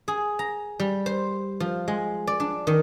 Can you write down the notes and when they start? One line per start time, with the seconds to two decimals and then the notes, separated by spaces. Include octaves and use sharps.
0.08 G#4
0.39 A#5
0.80 G3
1.06 C5
1.60 F3
1.88 G#3
2.27 D5
2.40 D4
2.67 D#3